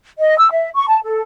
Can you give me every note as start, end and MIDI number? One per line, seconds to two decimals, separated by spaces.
0.18 0.37 75
0.39 0.48 88
0.51 0.70 76
0.75 0.85 85
0.88 0.98 81
1.04 1.21 69